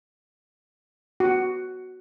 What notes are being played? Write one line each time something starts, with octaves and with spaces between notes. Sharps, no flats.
F#4